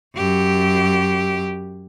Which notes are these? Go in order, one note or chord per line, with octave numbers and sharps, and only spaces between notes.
F#2 G4